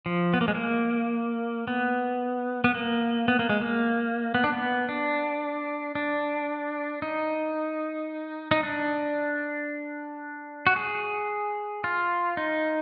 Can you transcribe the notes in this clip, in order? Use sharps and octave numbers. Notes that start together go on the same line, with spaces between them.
F3
B3
A#3
G#3
A#3
B3
B3
A#3
B3
A#3
G#3
A#3
B3
D4
B3
D4
D4
D#4
D#4
D4
F#4
G#4
F4
D#4